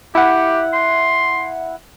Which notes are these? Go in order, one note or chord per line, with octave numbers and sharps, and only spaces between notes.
E4 G4 F#5
C6